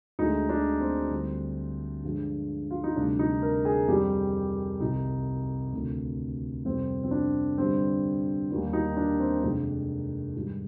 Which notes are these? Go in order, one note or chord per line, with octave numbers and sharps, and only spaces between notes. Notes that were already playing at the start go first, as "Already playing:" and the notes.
D2 D3 G#3 D#4
D4
C4
D2 D3 G3
G2 D3 F3 G#3
F4
D#4
D2 C3 G3 D4
D#4
A#4
G#4
F2 D#3 G3 G4
C2 C3 D#3 D#4
D2 C3 D#3
F2 C3 D#3 G3 C4
C4
D4
G2 D3 G3 C4
D#2 D#3 G3
D#4
D4
C4
F2 C3 D#3 G#3 D4
G#2 D#3 G3